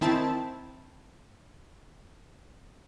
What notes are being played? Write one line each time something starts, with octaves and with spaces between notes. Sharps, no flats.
D#3 C4 E4 A5